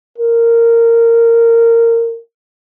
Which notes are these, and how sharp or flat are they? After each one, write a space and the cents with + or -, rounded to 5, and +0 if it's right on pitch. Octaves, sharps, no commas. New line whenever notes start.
A#4 -15